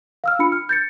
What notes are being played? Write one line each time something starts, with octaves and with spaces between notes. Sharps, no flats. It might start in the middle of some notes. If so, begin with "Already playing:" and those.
F5 E6 F6
D4 F4 B5 C#7
F6
G6 A6 C#7